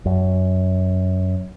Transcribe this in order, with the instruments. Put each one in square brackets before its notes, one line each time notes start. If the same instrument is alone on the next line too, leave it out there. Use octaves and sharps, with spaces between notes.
[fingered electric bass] F#2